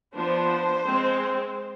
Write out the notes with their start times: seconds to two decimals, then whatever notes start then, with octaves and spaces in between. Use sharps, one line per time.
0.14 F3 B3 D4 C5
0.86 G#3 C4